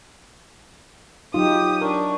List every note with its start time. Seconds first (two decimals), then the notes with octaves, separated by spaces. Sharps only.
1.34 F#3 D#4 F4 G4 D#6
1.81 D4 A#4 C#6